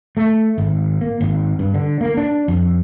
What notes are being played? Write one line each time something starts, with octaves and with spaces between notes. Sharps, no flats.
A3
G#1
A#3
G#1
G2
D3
A#3
D4
F2